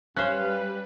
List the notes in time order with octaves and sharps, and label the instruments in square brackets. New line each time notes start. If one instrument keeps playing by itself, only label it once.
[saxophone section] F#2 F5 [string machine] G3 B4 [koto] C#4 C5 [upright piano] F#6